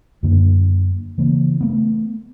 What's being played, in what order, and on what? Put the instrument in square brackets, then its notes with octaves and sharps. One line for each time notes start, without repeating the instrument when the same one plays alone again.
[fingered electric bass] F#2 D3 A#3
C#3 E3 A#3
A3 B3